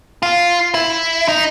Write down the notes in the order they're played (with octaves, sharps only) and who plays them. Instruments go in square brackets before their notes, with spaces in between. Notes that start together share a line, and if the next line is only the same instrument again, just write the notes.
[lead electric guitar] F4
E4
D#4